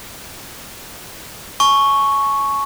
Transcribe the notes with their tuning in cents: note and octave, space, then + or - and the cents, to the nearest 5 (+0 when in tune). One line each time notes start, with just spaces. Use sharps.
G#5 +45 C#6 +0